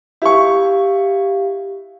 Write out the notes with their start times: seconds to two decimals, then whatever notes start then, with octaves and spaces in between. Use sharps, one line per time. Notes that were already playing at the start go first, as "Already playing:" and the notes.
0.22 E4 G4 F5 C#6